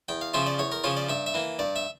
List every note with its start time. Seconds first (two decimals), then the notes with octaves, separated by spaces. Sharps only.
0.08 E2 G5
0.21 F5
0.34 C#3 F3 C#4 F4 E5
0.47 D5
0.59 E2 C#5
0.72 A#4
0.84 C#3 F3 C#4 F4 C#5
0.97 D5
1.09 G2 E5
1.26 E5
1.34 E3 A#3
1.59 G2 D5
1.76 E5